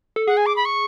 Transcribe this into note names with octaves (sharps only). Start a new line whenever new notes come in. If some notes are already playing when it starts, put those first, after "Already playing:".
A4
G#4 F#5
G#5
D6
B5
C#6